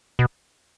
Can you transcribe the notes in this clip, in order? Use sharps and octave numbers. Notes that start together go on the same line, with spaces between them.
B2